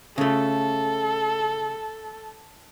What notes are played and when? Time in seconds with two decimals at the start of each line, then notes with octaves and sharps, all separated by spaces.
0.18 C#3 A3 A4